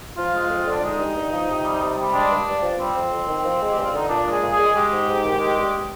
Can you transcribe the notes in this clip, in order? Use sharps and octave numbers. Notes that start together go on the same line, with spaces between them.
F3 F4
G#3
F2
D3 D4
G#3 D#4
G2
G2
F3
C3
G3
C3
G3
G#3 D4
G2
G2
F3
G3 C4
F2
F2
D#3
F3
G#3
G4
G2
F4
D3 D#4
A#2 D4
G#3
G#4
A#2
G#4
G#3
G#3 G4
G#2
G#2
D#3
G#3
G2